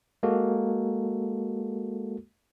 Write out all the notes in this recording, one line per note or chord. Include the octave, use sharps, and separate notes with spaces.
G#3 A#3 F#4 A4